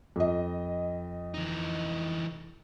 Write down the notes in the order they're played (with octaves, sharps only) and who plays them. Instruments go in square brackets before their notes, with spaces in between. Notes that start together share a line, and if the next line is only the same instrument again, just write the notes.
[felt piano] F2 D#5
[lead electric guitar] E3 D#4